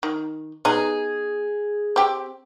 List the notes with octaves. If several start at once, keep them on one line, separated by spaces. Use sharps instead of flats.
D#3
B3 D#4 G#4
C4 G4